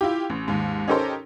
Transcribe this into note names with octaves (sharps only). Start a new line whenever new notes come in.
E4 F4 G4
A1
D#2 G#2
C#4 D#4 G4 A4 A#4 C5